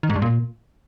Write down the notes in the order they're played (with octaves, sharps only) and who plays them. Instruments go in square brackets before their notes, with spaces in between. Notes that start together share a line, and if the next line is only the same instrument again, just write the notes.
[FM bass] D#3
G#2
G2
A#2